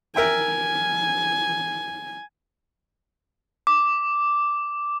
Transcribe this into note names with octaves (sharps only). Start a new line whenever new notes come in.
A#4 E5 G5 G#5
D6